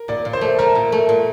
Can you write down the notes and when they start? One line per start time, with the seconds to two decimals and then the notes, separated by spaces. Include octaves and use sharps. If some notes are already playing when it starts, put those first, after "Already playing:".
Already playing: A#4
0.08 A#2 D5
0.25 A#2
0.33 C5
0.41 A3
0.59 A3 A#4
0.75 A#2
0.92 A3
1.09 A#2